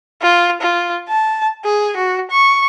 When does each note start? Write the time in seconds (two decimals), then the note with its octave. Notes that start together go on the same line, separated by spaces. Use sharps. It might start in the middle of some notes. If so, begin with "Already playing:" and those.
0.22 F4
0.61 F4
1.08 A5
1.64 G#4
1.97 F#4
2.31 C#6